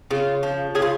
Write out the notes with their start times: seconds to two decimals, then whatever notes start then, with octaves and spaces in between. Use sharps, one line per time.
0.11 C#3 F4
0.43 F3
0.75 C#3 G#4
0.82 F4